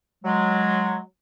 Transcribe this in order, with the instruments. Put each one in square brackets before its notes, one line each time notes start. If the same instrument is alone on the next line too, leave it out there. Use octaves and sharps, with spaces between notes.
[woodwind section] F#3 G#3